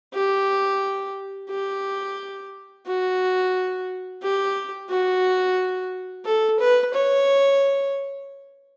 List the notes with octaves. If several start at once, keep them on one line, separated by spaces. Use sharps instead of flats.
G4
G4
F#4
G4
F#4
A4
B4
C#5